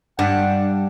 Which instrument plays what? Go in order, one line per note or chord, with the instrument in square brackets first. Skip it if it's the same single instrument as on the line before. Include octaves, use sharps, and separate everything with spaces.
[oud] G2 [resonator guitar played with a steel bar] D4 [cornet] F#5